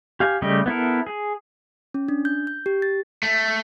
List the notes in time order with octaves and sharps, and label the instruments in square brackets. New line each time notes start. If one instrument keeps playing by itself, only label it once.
[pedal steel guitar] G4 F5 G#5
C#3 G3 A3 G4 D#5
B3 E4 A4 A#4
G#4
[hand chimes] C#4
D4
G6
G6
G4
A6
[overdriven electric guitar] A3